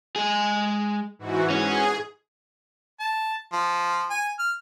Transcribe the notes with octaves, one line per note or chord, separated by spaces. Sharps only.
G#3 G#4
G#2 E3 F#4
C#4 G#4
A5
F3
G#5
F6